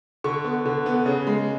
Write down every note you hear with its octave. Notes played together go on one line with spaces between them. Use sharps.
D3 C#6
B3
D3
B3
C#3
G#3